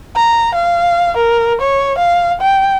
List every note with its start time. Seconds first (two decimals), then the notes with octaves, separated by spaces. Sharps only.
0.16 A#5
0.55 F5
1.17 A#4
1.61 C#5
1.98 F5
2.41 G5